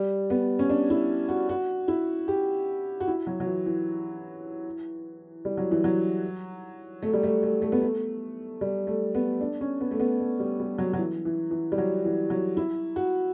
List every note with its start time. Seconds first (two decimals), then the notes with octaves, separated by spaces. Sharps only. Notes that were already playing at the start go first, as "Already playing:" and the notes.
Already playing: G3
0.30 B3
0.59 C#4
0.70 D4
0.90 E4
1.29 F#4
1.49 F#4
1.88 E4
2.28 G4
3.00 F#4
3.08 E4
3.27 F#3
3.40 F#3
3.47 E3
3.66 E3
5.45 G3
5.57 F#3
5.71 E3
5.84 F#3
7.02 A3
7.13 G3
7.23 A3
7.43 A3
7.62 A3
7.72 B3
7.82 A3
8.61 G3
8.87 A3
9.15 B3
9.41 D4
9.61 C#4
9.81 B3
9.91 A3
10.00 B3
10.20 A3
10.40 G3
10.60 G3
10.78 F#3
10.93 F#3
10.98 E3
11.25 E3
11.51 E3
11.72 G3
11.78 F#3
12.05 E3
12.30 F#3
12.57 E4
12.96 F#4